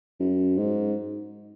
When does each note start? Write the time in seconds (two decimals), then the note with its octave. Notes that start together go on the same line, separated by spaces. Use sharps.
0.20 F#2
0.58 G#2